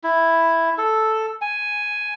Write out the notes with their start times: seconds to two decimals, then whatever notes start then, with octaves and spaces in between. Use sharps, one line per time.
0.04 E4
0.78 A4
1.41 G#5